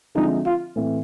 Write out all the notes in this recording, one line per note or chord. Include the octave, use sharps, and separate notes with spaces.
D3 F3 G#3 C4 D#4 E4
F4
A2 E3 A3 C4